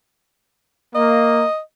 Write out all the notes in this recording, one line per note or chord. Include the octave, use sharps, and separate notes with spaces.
A#3 D#5